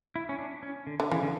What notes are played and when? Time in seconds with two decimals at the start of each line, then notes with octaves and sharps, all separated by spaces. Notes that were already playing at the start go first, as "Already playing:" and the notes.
0.16 E4
0.29 C#4
0.38 D4
0.63 C#4
0.87 D3
1.00 D3
1.11 C#3 E3
1.23 D3